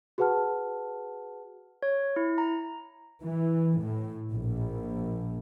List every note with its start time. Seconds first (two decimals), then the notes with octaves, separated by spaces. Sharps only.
0.18 F#4 G#4 B4 F#5 A5 F6
1.83 C#5
2.16 E4
2.38 A#5
3.24 E3
3.80 A2
4.32 A#1